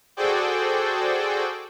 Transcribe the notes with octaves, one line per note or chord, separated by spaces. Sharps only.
F#4 G#4 A4 C5 D5 G5